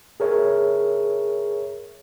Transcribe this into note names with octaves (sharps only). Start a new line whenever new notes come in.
G#4 A#4 C#5 E5